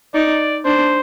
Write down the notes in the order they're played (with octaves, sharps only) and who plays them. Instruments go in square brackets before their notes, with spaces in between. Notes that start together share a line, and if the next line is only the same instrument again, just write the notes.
[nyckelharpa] D#4 [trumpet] D5
[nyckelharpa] D4 [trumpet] C5